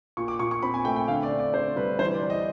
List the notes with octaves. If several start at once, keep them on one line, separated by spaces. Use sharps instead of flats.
A#2 C#6
D6
A#2 C#6
C#6
C4 B5
G#5
A3 G5
G5
D3 F5
D5
C4
D5
D3 C5
G3 B4
E3 C5
D5
E3
D#5